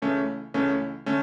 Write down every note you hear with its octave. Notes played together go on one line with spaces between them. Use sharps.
C#2 C#3 E3 A3 C#4
C#2 C#3 E3 A3 C#4
D3 A3 C#4